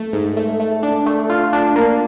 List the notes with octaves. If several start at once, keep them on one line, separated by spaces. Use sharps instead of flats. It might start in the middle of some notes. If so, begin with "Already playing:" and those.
Already playing: A3
G#2
A3
A3
D4
A3
F4
D4
A#3